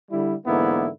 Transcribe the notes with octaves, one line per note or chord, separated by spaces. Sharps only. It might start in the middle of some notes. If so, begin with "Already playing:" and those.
D3 G3 E4
G#2 D3 E3 A#3 B3 E4